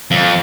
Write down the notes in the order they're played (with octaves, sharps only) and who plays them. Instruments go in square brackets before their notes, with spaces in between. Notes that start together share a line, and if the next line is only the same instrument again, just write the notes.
[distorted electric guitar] F2